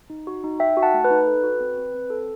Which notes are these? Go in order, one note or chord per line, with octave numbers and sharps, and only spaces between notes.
D#4
F#4
D#4
D#4 E5 G5
F#4
F#5 A5
A3
B4
D#4
A4
F#4
C4
C4
C4
A4